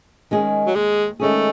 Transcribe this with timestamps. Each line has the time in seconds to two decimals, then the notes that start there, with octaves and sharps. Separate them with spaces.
0.31 D#3 G#3 C#4 G#4
0.67 F#3
0.75 D#2 G#3
1.20 D#3 G#3 A3 C#4 G#4